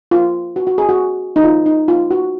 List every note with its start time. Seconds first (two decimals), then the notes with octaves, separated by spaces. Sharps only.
0.11 F4
0.56 F#4
0.67 F#4
0.78 G#4
0.89 F#4
1.36 D#4
1.44 F4
1.66 D#4
1.88 F4
2.11 F#4